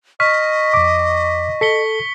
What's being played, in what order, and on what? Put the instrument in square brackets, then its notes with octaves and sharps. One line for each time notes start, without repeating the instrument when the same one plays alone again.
[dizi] D#5 [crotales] C#6 B6 [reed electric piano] F6
[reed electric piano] F2 D6
[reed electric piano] A4 [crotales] B6 C#7 G7